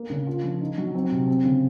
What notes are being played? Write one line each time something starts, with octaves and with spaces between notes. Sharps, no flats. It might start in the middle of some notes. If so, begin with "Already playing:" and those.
Already playing: A#3
C#3
F4
F3
D#4
F#3
C4
C3
C4
C#3